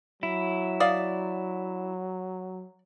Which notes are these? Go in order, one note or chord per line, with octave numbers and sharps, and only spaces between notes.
F#3 E4
D5 F5 D#6